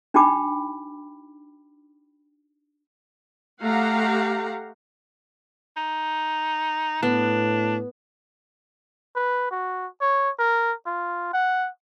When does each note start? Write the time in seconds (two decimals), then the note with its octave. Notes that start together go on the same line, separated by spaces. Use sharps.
0.14 D4 D#4 F#4 G5 B5 D6
3.62 A3 G4 F5 F#5 A#5
5.77 D#4
7.03 A2 B3 D4
9.16 B4
9.51 F#4
10.01 C#5
10.39 A#4
10.86 F4
11.33 F#5